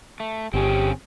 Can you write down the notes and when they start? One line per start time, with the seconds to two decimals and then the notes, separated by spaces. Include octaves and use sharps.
0.20 A3
0.54 G1 C4 C#4 G4 G#4